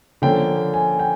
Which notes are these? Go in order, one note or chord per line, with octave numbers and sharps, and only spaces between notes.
D3 F3 A#3 C#4 G5
G#5
G5